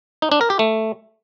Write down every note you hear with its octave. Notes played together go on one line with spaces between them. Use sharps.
D#4
D4
A#4
G4
A3